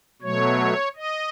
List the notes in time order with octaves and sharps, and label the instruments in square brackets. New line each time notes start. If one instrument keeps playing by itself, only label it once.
[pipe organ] B2 F#3 A3 C#5
D#5